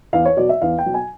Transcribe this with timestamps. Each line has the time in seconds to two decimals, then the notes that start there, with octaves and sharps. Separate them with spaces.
0.13 E2 F5
0.25 C#5
0.37 B2 F#3 D5
0.49 E5
0.62 E2 F5
0.79 G5
0.86 B2 F#3
0.94 G#5